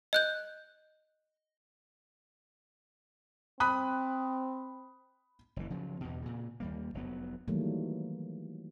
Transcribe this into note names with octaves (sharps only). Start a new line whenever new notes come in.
D#5 F#6 G6
C4 B5 D#6 F#6
F#1 E3
C#3 F3 F#3
E2 G2 B2
A#2 C#3
D#2 G3 A#3
F1 F#3 B3
D#3 E3 F#3 G3 A3 A#3